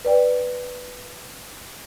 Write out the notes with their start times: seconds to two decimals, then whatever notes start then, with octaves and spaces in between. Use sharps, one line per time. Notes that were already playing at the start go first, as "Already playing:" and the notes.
0.05 B4 D5 G5